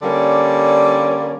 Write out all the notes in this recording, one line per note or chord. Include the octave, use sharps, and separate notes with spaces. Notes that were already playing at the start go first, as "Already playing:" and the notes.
D3 G3 A#3 C#4 D5